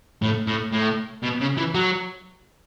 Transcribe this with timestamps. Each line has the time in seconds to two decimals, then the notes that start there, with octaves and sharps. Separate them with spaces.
0.22 A2
0.47 A2
0.72 A2
1.23 B2
1.41 C#3
1.58 E3
1.75 F#3